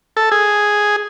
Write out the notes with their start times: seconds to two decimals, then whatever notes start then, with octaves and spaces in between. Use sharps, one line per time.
0.17 A4
0.32 G#4